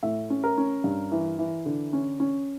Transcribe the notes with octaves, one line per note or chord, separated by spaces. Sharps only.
A2 E5
C#4
A#4
C#4
G2
E3
E3
D3
C#4
C#4